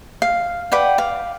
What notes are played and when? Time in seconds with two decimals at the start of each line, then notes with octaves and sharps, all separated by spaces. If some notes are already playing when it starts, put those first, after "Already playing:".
0.22 F5
0.72 B4 D5 F#5 G5
0.98 F5